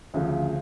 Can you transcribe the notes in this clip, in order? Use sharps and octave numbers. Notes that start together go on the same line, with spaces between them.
D2 C#3 F3